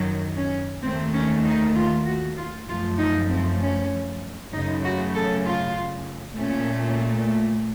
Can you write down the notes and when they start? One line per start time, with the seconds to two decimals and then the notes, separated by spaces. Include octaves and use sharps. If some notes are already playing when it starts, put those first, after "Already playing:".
Already playing: F#2 D#3 F#3
0.36 C#4
0.82 D#2 D#3 A3 C4
1.14 C#4
1.45 D#4
1.76 F4
2.06 F#4
2.37 F4
2.68 F#2 F3 A3 F4
2.98 D#4
3.30 C4
3.60 C#4
4.53 F#2 C#3 A3 D#4
4.84 F#4
5.15 A4
5.45 F4
6.38 A#2 A3 C#4